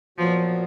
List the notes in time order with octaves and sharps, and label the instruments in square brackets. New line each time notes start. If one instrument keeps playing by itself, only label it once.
[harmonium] A#2 F#3 B3 F#4 [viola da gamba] F3